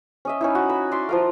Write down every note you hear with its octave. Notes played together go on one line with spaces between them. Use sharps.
C#4 D#5 E5
C#4 D#4 E4
F#4
B5
D5 E5 C6 C#6
F3 F4 A#4